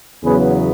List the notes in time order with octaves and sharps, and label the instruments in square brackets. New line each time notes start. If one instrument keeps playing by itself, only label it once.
[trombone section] E2 C#3 F#3 B3 G#4 B4